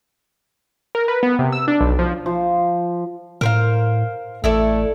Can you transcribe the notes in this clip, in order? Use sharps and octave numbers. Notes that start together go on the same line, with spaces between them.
A#4
B4
B3
C3
E6
D4
B1
F3
F3
A2 A#4 C5 F5
A1 A3 E4 A4 D5